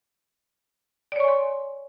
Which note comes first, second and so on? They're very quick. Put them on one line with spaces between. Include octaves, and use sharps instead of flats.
D5 C#5 C#6 G#5 C6